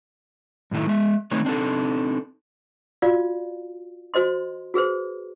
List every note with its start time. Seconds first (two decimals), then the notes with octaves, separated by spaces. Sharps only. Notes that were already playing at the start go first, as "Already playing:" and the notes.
0.71 F#2 A2 D#3 A3 E4
0.87 G#3 E5
1.31 D#3 A3 C4 D#4 B4 C#5
1.45 C4 D4 D#4 A4
3.02 F4 F#4 D5 F5
4.14 F#4 C5 D#5 C6
4.74 F#4 G#4 B4 C5